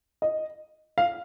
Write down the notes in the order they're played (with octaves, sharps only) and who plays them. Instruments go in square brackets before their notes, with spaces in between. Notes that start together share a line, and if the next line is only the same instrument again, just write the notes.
[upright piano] D#5
F5